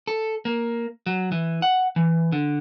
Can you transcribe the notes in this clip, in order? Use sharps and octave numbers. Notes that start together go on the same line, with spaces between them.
A4
A#3
F#3
E3
F#5
E3
D3